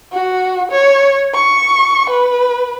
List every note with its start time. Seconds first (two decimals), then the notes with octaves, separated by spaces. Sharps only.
0.13 F#4
0.71 C#5
1.34 C#6
2.10 B4